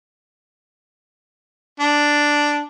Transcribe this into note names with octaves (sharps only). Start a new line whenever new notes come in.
D4